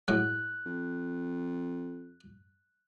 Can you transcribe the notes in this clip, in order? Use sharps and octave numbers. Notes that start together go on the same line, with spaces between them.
A2 F#3 G#3 F#6
F2